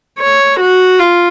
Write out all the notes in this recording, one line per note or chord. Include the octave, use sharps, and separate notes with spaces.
C#5
F#4
F4